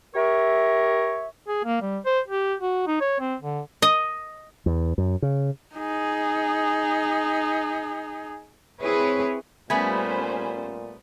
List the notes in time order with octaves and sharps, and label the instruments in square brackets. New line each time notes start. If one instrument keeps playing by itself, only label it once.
[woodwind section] G4 A#4 C#5 E5
[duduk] G#4
A#3
G3
C5
G4
F#4
D#4
C#5
C4
D3
[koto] D#5
[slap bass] E2
F#2
C#3
[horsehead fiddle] D#4 G#4
[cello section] C4 E4 G#4 B4 C#5
[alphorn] A#2 [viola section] G3 C#4 C5 [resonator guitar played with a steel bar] A3 B3 [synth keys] G#5 B5